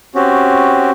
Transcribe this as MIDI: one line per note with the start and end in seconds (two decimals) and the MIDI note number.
0.15 0.91 60
0.15 0.91 61
0.15 0.91 66
0.15 0.91 67